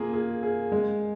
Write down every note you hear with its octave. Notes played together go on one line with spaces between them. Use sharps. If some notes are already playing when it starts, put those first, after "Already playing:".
Already playing: A#3 F4 G#4
G#4
G#4
G#3